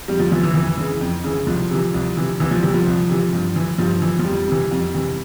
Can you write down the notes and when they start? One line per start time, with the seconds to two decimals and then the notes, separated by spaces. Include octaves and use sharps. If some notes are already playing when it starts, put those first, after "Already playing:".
0.08 F2 G3
0.19 F3
0.31 E3 F3
0.43 E3
0.54 F2 E3
0.78 C#3 E3
1.01 F2
1.24 C#3 E3
1.47 C2 F3
1.71 C3 E3
1.94 C2
2.17 C3 E3
2.40 C2 E3
2.51 F3
2.63 C3 E3 G3
2.74 F3
2.87 C2
3.09 C3 E3
3.33 G2
3.56 E3
3.78 G2 F3
4.02 E3
4.19 F3
4.24 F2 G3
4.48 C3 E3
4.71 F2
4.94 C3 E3